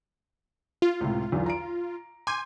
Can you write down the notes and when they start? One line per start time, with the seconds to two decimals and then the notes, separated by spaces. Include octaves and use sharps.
0.82 F4
1.01 C#2 A2 C3
1.32 B1 E2 D3
1.46 A#5 D7
2.27 G#5 C6 D6 G6